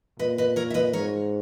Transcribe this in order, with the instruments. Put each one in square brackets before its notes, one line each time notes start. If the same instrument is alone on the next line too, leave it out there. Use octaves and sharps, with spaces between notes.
[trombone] A#2 [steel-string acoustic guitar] B4 D#5
[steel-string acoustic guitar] B4 D#5
A#4 C#5
E5
B4 D#5
[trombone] G#2 [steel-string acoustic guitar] A#4 C#5